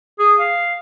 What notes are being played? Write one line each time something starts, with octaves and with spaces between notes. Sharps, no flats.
G#4
F5